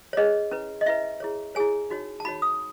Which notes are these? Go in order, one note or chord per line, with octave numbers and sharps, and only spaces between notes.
C#5
C#4 G#4 B4 D#5
C#4 E4 B4
D#5
C#4 E4 B4 E5
E4 G#4 C#5
E4 G#4 C#5 G#5
D#4 F#4 C#5
A5
D#4 F#4 C#5 B5
D#6